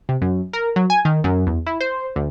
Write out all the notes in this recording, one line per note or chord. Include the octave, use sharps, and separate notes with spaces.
C3
F#2
A#4
F#3
G#5
D#3
F#2
E2
E4
C5
D2